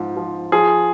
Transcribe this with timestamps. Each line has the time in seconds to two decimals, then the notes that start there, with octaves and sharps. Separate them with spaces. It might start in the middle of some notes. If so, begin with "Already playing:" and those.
Already playing: G#2 F3
0.17 F3
0.52 F3 G#4